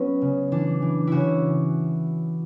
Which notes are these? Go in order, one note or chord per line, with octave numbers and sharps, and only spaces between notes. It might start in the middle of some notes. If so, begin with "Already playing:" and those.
Already playing: F#3 B3 C#4
C#3
E3 D4
E3
C#3 E4 F#4